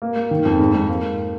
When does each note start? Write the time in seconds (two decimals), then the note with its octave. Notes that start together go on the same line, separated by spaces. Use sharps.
0.02 A#3
0.16 A#3
0.31 D#3
0.45 F2
0.59 G#2
0.74 G#2
0.88 A#3